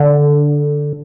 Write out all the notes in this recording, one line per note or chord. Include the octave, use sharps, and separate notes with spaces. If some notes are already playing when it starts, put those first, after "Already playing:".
Already playing: D3